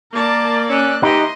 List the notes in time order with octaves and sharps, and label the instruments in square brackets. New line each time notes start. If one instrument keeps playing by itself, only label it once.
[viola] A#3 D5 [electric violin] A#4 A5
[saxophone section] C#4 [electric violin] E6 F#6
[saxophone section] E3 G4 [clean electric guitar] D#4 [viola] D#5 [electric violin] C6